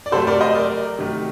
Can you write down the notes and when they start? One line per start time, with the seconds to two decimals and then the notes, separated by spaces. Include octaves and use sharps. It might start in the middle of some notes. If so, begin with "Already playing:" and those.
0.06 D5
0.12 C3 F#3 A3 A4 C5
0.27 A#4 D5
0.41 C5 D#5
0.55 A#4 D5
0.98 C3 D#3 F#3 A3